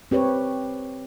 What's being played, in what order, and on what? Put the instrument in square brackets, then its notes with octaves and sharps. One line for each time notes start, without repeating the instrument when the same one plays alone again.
[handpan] C4 G4 B4 C#5